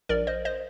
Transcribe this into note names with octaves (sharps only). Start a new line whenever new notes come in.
A#1 A#4 D5
C5 D#5
C5 D#5